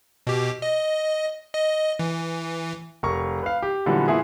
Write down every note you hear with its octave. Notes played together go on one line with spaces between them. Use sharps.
B2 G4
D#5
D#5
E3
F1 A#4 A#5 C#6
B4 F5
G4
A#2 D3 E3 F#3 G3 B3
A#2 E3 E4 G#4